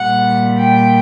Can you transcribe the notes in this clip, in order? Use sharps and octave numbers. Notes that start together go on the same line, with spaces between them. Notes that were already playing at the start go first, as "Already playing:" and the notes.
Already playing: A#2 G3 F#5
G5